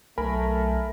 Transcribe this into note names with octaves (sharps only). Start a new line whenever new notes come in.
B1 A3 A#4 G#5 B5